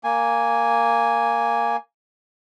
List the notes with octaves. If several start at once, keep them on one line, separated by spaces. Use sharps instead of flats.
A#3 G#5